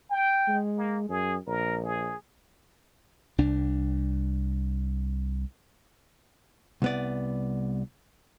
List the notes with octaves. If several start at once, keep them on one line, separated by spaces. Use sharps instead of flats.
G5
G#3
A#3
F#2 G#4
A#1 A#4
G#4
C2 D4
C2 B3 D5